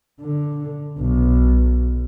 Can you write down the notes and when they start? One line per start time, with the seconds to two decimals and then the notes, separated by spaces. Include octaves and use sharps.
0.21 D3
0.98 B1